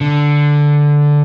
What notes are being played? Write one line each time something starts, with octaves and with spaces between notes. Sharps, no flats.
D3